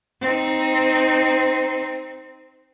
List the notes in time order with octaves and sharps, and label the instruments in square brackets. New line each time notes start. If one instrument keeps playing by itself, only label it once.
[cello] C4 D#4